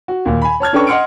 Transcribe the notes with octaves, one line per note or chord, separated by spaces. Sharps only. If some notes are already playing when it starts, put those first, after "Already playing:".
F#4
D#2 A#2
G#5 B5
C#5 A5 F6 G#6
C#4 D4 A4 B4 G5 C#6
D#5 F#5 C6 F6 C#7 D7